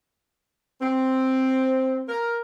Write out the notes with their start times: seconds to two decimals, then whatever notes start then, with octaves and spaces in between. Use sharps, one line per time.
0.81 C4
2.09 A#4